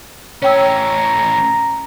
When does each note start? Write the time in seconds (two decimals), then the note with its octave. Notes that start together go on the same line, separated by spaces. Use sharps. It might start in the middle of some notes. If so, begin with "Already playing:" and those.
0.42 A2 C#4 C#5 G5 A#5 E6